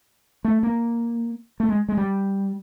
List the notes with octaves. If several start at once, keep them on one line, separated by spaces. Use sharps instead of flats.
A3
A#3
A3
G#3
G#3
G3